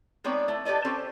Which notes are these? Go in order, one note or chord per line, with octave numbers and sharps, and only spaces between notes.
G#3 B3 C4 D#4 C#5 D5
A3 E4
G4 A4 B4 D5 D#5
C4 C#4 F4 G4 A4 C5